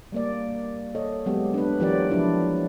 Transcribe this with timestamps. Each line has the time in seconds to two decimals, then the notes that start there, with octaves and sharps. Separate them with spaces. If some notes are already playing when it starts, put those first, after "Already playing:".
0.12 G3 A#3 D5
0.95 A4 C#5 D#5
1.26 F#3 G#3 B3 G4
1.54 D4 B4
1.80 E3 F#3 F4 G4 A#4 D5
2.10 F3 F#3 D4 E4